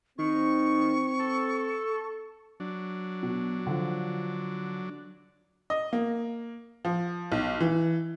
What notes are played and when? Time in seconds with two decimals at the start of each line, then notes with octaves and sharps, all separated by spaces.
0.19 D#3 C4 C#6
1.19 A4
2.60 F#3 D4
3.23 B2
3.66 D3 F3
5.70 D#5
5.93 A#3
6.85 F3
7.32 B1
7.60 E3